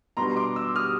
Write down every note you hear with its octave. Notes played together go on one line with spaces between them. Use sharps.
B2 G3 B3 D4 A#5 C6
C6 D6
D6 E6
D#6 F6